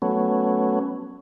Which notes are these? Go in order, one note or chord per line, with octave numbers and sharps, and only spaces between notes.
F#3 A3 B3 C#4